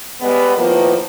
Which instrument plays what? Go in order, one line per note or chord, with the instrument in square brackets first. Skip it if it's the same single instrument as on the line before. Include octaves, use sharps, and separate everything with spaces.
[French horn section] G3 G#3 B3
A2 D#3 F3 A#3 B3